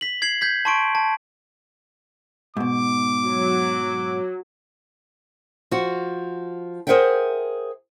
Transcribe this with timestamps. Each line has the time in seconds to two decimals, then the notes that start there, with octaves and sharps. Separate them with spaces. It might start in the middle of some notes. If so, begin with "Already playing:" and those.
0.01 B6 F#7
0.22 G#6 C7 F#7
0.41 G6 G#6 B6
0.65 A5 C6 C#6 D7
0.95 A5
2.57 G#2 B2 D6
3.25 F#3
5.71 F3 F#4
6.87 G#4 A#4 C5 E5 F#5 G5